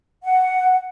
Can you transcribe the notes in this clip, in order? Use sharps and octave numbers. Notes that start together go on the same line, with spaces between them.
F#5